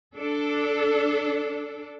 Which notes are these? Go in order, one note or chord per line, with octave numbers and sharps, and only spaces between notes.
D4 A4